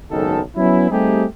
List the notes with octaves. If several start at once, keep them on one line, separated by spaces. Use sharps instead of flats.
F#1 B1 G#2 D#3 A4
F#3 B3 C#4 E4
G3 A3 C4 D#4 G4 G#4